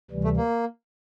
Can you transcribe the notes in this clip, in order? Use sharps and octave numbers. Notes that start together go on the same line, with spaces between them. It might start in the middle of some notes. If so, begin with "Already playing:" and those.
D2 C3 E3 G3
A3
A#3